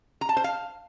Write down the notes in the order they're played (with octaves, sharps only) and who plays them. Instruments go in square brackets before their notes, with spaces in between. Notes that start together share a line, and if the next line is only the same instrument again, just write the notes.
[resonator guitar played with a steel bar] A#5
A5
C5
F5